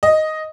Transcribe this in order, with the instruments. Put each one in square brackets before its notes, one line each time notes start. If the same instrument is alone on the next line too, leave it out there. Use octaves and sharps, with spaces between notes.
[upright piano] D#5